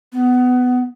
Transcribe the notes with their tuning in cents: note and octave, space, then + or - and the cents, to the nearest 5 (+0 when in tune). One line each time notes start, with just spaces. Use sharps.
B3 +15